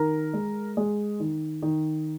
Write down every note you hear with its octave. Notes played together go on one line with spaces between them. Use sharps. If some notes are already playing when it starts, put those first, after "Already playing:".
Already playing: D#3 A#4
G#3
G#3
D#3
D#3